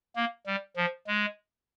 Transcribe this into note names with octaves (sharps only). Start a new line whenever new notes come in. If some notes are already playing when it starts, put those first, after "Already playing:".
A#3
G3
F3
G#3